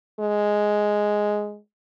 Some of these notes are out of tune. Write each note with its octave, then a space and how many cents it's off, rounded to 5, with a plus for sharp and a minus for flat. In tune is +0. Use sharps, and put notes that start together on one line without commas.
G#3 +5